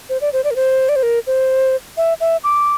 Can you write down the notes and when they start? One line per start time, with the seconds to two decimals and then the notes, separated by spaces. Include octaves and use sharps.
0.09 C5
0.21 D5
0.33 C5
0.44 D5
0.51 A#4
0.56 C5
0.89 D5
0.96 C5
1.03 A#4
1.27 C5
1.97 E5
2.20 E5
2.44 D6